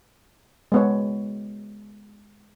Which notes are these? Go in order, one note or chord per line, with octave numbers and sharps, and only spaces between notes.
G#3 B3 C#5